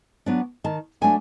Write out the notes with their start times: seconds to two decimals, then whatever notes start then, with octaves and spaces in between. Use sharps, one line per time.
0.26 F#3 B3 D4
0.64 D#3 A5
1.01 F#3 A3 D4 G#5